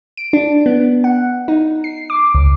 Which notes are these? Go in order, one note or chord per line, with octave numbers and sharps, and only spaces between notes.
D7
D4
B3
F#5
D#4
C7
D6
C#2